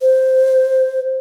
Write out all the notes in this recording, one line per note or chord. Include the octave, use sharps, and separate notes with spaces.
C5